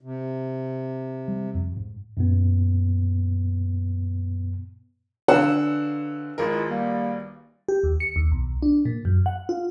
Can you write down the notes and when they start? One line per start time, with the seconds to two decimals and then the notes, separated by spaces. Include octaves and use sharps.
0.01 C3
1.28 G3
1.54 F2
1.77 G#2
2.17 F#2 A#2 B3
5.28 D3 F5 F#5 E6
6.38 G#1 G#3 E4 F4 A#4
6.69 G3 A#3
7.68 G4
7.84 D#2
8.00 C#7
8.16 D#2
8.32 B1
8.62 D4
8.85 A#2
9.05 F#2
9.26 F#5
9.49 F4